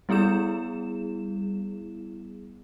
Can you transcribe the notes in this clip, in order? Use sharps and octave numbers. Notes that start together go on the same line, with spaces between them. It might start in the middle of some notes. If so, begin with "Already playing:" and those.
G3 B3 E4 G#4 E7